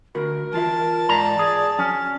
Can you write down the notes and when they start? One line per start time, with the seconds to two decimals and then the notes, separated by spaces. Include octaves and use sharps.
0.15 D2 F#4 A#4 B5
0.54 E3 F4 E5 A5
1.09 G#2 D5 A#5
1.39 G#4
1.79 F#3 C#4